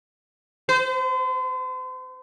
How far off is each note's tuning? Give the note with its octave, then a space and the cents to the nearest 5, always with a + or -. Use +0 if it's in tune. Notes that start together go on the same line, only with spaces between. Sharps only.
C5 -40